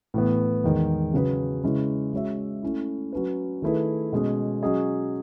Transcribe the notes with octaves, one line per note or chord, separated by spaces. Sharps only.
A2 E3 B3
E2 D#3 G#3
C#3 F#3 C#4 G#4 B4
C#3 G#3 C#4 E4 B4
G#3 C#4 F#4 C#5 E5
A3 C#4 E4
F#3 C#4 F#4 B4
D#3 A3 E4 G#4 B4
B2 G#3 C#4 G#4
F#3 C#4 G#4 D#5